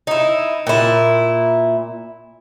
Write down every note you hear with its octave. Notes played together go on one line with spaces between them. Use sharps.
D#4 E4
A#2 E4